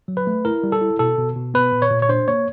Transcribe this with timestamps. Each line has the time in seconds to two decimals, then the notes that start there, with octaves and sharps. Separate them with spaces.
0.08 F#3
0.17 B4
0.27 A3
0.45 E4 A#4
0.63 G3
0.72 A4
0.81 E4
0.99 B2 A4
1.18 B2
1.36 B2
1.54 B3 B4
1.72 A#2
1.82 C#5
1.91 A#2
2.02 C#5
2.09 D4 C5
2.28 A#3 C#5